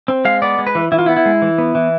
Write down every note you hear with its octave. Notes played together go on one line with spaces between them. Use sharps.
C4
G#3 F5
B3 D5
G#3
B4
E3
E3 E4
F4
B3 E4
E4
G#3
E3
B3
E3